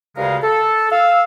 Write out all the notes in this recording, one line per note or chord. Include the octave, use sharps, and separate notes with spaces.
D2 G2 C#3 G#3 A#4 F5
A4
F5 E6